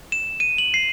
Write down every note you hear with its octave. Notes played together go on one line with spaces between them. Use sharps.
E7
D#7
F#7
C7